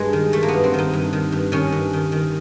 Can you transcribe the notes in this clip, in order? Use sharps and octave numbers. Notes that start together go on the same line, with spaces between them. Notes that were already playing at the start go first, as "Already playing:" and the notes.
Already playing: G2 G#3
D#3
D#3 A3
A#3
B3
G2
C4
D#3 D#4
G2
D#3
G2
D#3 C#4
G2
D#3
D#3